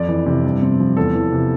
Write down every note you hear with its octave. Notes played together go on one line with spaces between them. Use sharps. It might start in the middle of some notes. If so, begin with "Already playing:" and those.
Already playing: F2 D5
E3
C3
G2
C4
F3
E2 A4
E3
C3